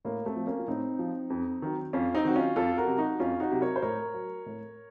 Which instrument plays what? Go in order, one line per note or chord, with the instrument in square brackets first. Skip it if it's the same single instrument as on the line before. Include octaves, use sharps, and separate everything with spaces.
[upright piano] A2 A#3
A3 C4
F3
A#3 C#4
F4
A2 C4 D#4
F3
F2
D#3 F#3
F2 C#4 F4
C4 D#4
D#3 F#3 F#4
C#4 F4
F2 F4 A4
F#4 A#4
C3 F#3
D#4 F#4
F2 C#4 F4
D#4 F#4
C3 F#3
A#4 C#5
C5
A2 A#4 C#5
F#3
A2